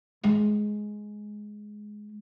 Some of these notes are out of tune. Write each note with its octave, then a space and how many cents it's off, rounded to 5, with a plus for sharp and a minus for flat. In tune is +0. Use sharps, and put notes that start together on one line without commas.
G#3 +10